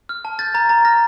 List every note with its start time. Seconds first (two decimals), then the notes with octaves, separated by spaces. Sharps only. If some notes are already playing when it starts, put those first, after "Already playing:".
0.09 F6
0.25 A5
0.39 G6 A6
0.54 A#5 A6
0.69 A#5 A6
0.85 F6 A#6